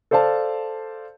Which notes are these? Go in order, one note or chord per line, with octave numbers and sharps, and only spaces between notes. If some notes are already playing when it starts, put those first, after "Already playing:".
A4 C5 D5 F5 A5